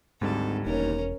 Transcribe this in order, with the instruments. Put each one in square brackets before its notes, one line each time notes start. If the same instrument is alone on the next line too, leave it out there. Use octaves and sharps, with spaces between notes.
[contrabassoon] G#1 [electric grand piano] D2 G3 [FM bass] G#2 [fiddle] A4
[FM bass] E1 [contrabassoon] D#2 [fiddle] C#4 A#4